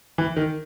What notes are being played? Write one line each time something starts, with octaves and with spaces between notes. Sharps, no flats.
E3
D#3